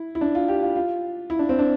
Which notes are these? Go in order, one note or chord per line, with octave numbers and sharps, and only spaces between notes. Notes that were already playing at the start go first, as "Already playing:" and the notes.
Already playing: E4
E4
D4
F4
G4
F4
F4
E4
D4
C4
D4